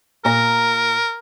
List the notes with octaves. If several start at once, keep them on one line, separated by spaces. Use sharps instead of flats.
A#2 A#4 A#5